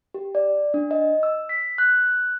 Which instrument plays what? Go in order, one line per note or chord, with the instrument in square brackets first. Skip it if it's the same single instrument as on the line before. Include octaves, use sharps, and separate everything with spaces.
[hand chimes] G4
D5
D4
D#5
E6
B6
F#6